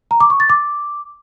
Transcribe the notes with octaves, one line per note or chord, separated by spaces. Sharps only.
A#5
D6
C#6
A6
D6